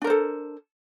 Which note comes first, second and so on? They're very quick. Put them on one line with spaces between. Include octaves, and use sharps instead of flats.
D4 A#4 C5 A4